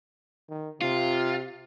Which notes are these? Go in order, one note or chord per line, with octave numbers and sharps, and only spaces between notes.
D#3
C3 F4